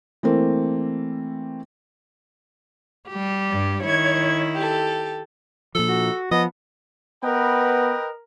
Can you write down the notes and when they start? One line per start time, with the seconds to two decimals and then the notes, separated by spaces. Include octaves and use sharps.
0.23 E3 A3 A#3 C4
3.08 G3 G4
3.49 G2
3.84 D#3 E4 C#5 G#6
4.54 G4 A4
5.75 A#2 F3 A4
5.89 F#4
6.31 F3 B3 D#5
7.24 B3 A#4 B4 D#5 G5